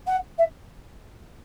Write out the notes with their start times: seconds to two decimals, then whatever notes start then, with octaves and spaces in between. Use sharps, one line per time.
0.06 F#5
0.38 E5